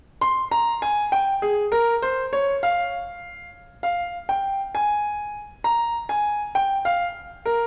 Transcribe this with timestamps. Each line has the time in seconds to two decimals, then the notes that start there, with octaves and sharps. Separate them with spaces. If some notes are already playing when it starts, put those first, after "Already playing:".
0.21 C6
0.51 A#5
0.82 G#5
1.12 G5
1.42 G#4
1.72 A#4
2.02 C5
2.33 C#5
2.63 F5
3.83 F5
4.29 G5
4.75 G#5
5.64 A#5
6.09 G#5
6.55 G5
6.85 F5
7.46 A#4